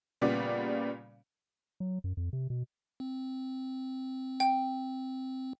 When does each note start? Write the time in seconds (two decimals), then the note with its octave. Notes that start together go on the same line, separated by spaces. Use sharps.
0.21 A#2 C#3 G3 B3 D5
1.80 F#3
2.04 F#2
2.17 F2
2.33 C3
2.50 B2
3.00 C4
4.40 G5